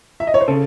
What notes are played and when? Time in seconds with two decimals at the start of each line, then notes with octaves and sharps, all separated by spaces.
0.20 E5
0.27 D#5
0.34 C#5
0.41 C5
0.48 C#3 A4